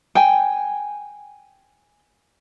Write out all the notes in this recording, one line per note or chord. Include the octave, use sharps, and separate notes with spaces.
G5 G#5